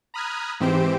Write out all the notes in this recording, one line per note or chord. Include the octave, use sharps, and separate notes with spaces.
A#5 B5 D#6 F6 F#6 G#6
G#2 E3 C4 G4 C5 D7